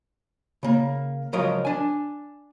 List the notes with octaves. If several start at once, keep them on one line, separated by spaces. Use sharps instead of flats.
C#3 A#3
C#2 F3 F#3 A#4 D#5 F5
D4 G#5